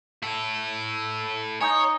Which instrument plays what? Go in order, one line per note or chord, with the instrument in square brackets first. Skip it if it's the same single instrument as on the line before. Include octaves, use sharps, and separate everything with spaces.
[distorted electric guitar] E4 A4
[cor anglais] D#4 [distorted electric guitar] C#5 [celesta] G#5 D#6 G6